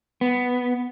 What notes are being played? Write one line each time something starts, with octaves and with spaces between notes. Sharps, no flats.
B3